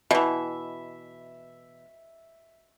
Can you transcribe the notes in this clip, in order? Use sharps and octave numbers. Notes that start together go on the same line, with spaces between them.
B2 E3 E5